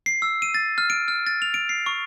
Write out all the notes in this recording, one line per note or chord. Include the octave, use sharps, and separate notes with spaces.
C7
E6
D#7
A6
F6
D7
F6
A6
F7
D7
C7
C#6